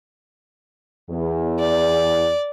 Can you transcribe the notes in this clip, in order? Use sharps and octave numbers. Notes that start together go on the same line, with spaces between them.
E2
D5